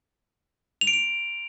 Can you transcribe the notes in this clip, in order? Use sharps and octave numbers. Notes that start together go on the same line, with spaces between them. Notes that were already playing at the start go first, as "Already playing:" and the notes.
F7
D7
F7